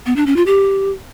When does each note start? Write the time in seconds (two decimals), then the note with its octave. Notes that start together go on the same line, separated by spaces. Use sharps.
0.06 B3
0.16 D4
0.26 C#4
0.36 F4
0.46 G4